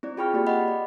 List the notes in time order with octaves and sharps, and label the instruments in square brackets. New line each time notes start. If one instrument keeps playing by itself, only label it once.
[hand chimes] C4 E4 D5
F4 G#4 G5 B5 C#6 F6
A#3 F#4 G4 D5
D#5 F#5 B5
D5